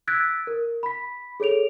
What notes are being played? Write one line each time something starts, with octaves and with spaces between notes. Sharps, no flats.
E6 F#6 G#6 A6 B6 D7
A#4
B5 B6
G#4 A4 C#5 D7 F7